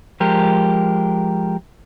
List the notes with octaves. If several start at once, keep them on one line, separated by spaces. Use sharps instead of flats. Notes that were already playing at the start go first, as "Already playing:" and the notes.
F3 G#3 G4 A#4